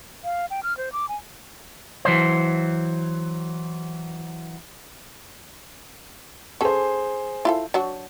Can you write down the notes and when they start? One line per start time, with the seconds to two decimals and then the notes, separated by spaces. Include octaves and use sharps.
0.24 F5
0.50 G5
0.63 F6
0.77 C5
0.92 D6
1.09 G#5
2.05 E3 F#3 C5
6.61 C#4 G#4 A4 C5
7.45 E4 F4 A4
7.74 F#3 D4 F#4